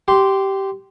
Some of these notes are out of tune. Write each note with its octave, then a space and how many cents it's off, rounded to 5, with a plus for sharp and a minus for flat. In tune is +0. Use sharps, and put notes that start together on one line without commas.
G4 -10 C6 -5